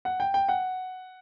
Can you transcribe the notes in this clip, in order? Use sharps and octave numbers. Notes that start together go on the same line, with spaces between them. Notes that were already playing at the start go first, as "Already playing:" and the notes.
F#5
G5
G5
F#5